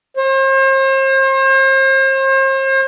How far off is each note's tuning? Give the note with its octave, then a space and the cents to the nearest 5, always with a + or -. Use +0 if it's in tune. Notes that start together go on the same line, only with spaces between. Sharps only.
C5 +40